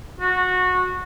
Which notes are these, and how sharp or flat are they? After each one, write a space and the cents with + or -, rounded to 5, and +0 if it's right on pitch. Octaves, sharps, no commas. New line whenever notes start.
F#4 -20